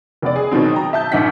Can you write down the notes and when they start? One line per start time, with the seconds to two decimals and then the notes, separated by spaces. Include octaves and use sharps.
0.22 F1 B3 D5
0.36 G#4
0.51 B2 D#3 F#3 C4
0.74 G5 A#5
0.93 E5 A5 G6
1.12 A#1 G#2 F#5 B6